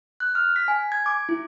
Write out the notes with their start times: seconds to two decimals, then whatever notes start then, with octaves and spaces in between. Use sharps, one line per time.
0.20 F#6
0.35 F6
0.56 B6
0.68 G#5
0.92 G#6
1.06 D6
1.29 E4